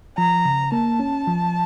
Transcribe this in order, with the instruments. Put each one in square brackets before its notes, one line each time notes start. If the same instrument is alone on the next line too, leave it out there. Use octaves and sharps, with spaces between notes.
[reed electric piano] F3 [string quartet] A#5
[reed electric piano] C#3
[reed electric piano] A#3 [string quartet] A5
[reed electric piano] C#4
F3